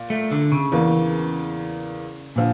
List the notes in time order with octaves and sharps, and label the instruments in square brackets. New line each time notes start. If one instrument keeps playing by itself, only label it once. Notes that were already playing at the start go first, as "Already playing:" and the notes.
Already playing: [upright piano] A#2
[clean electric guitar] A3
D3
C#3
[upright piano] E2 E3 A#3
[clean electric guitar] A#2 [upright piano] D3 F3